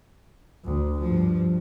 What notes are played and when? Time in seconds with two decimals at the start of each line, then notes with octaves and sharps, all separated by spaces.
0.65 D2
1.00 G2 F3